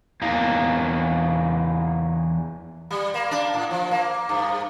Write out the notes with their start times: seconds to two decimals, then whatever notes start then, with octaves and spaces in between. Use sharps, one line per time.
0.22 E2 A#3
2.91 G3
3.14 A#3
3.31 D4
3.54 A2
3.71 F3
3.91 A#3
4.29 G2